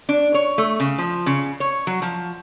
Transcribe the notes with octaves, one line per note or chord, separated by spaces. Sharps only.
D4
C#5
A3
C#3
F3
C#3
C#5
F#3
F3